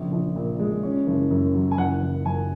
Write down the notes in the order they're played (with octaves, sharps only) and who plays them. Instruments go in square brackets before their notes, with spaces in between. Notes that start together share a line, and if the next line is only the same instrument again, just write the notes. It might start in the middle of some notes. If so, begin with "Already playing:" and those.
Already playing: [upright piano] A#1 C#3
A#1
A#2
G#3
C#4
F#1
F#2
F#3
G#5
F#1 F#5
F#1
F#2 G#5